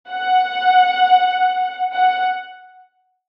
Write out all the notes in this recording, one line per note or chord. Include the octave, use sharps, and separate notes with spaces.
F#5
F#5